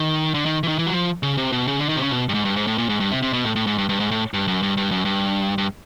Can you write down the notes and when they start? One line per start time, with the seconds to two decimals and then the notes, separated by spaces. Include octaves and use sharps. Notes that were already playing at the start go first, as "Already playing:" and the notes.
Already playing: D#3
0.34 D3
0.46 D#3
0.63 E3
0.68 D#3
0.78 E3
0.87 F#3
0.93 F3
1.23 C#3
1.38 C3
1.52 B2
1.67 C#3
1.79 D3
1.89 D#3
1.96 C3
2.00 C#3
2.11 B2
2.29 G2
2.34 G#2
2.45 G2
2.56 G#2
2.67 A2
2.78 A#2
2.89 G#2
3.00 G2
3.11 C3
3.22 C3
3.33 B2
3.45 A2
3.56 A2
3.67 G#2
3.78 G2
3.89 G2
4.00 G#2
4.11 A2
4.34 G2
4.48 F#2
4.62 G2
4.77 G2
4.91 F#2
5.05 G2
5.58 G2